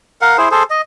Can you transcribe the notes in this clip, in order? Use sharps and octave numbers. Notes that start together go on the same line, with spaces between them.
A#4 F5 F#5
E4 G#4 C5
G#4 A4 C5
D#5